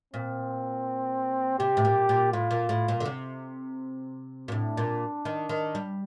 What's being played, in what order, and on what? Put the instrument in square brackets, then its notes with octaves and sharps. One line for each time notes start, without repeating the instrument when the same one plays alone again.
[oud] A#2 [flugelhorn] C4
[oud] C3 [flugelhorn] G4
[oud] A2
A#2
A#2
[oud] A2 [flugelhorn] F4
[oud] A#2
A2
A#2
D3
C3
A#2
[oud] A2 [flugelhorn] D4
[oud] A#2
D#3
D#3
G3